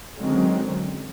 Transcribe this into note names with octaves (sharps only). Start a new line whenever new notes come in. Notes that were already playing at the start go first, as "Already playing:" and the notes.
D3 D#3 F#3 G#3 C4 C#4